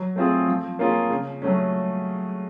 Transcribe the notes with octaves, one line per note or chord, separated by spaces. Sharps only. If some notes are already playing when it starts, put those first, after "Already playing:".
Already playing: F#3
A3 C4 F4 G#4
F3
A#3 C#4 F4 G#4
C#3
F#3 A3 C#4